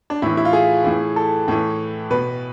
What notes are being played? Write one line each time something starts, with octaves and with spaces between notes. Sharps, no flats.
D4
A2 E3 E4
E4
F4
G#4
A2 E3
A4
A2 E3
B2 B4